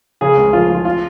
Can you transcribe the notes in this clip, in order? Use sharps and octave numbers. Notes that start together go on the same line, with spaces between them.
C#3 G#4
C#2
F3 F4
F3 F4
F4